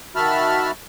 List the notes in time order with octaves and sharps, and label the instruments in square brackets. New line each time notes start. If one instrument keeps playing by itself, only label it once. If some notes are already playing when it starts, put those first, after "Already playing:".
[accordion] D#3 F#4 E5 A5 B5 F6